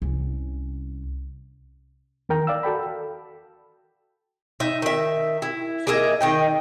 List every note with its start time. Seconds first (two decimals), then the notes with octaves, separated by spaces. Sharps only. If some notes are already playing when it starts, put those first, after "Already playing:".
0.02 C2 C#4
2.29 E2 D#3 A#4 G5 A#5
2.47 D5 F5 E6
2.63 F#4 A4 G5 B5
4.60 D#4 E5
4.82 D#3 E5
5.42 E4
5.87 A#3 G#4 D#5 E5
6.21 D#3 D#5 G5